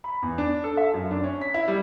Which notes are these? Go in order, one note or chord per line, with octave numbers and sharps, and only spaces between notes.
B5
E2
D4
A4
E5
F#2
D4
C#4
B6
E4
G3